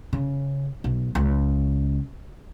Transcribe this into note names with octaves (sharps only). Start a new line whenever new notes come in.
C#3
B1
C#2